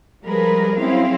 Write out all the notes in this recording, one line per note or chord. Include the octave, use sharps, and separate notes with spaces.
F3 G3 G#3 G#4 A#4 B4
F#3 C4 C#4 E4 G#4 F5